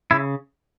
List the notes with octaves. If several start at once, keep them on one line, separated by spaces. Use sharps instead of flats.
C#3 E4